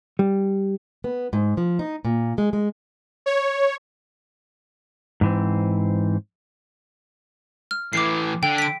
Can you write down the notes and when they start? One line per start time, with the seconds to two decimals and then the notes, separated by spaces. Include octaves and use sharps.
0.19 G3
1.04 B3
1.33 G#2
1.57 F3
1.79 D#4
2.05 A#2
2.38 G#3
2.53 G#3
3.26 C#5
5.21 G#2 E3 C4
7.71 F6
7.93 A2 E3 D6 C7
8.43 D3 G5
8.58 B6 D7